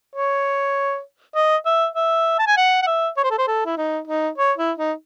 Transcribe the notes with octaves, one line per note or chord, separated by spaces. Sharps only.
C#5
D#5
E5
E5
A5
G#5
F#5
F#5
E5
C#5
C5
A4
C5
A4
E4
D#4
D#4
C#5
E4
D#4